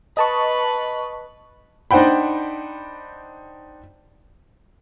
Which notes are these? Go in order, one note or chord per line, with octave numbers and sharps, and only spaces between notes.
B4 D#5 A5 C#6
D4 D#4 C5 F#5 G5 B5